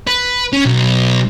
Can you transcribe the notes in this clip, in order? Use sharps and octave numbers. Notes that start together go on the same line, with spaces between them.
B4
C#4
B1